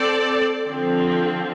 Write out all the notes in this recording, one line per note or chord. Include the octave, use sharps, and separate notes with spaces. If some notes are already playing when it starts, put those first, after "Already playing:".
Already playing: C4 A4 D5
D3 F3 C4